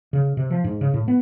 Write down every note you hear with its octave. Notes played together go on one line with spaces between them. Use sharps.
C#3
C3
F3
G#2
C#3
A2
B3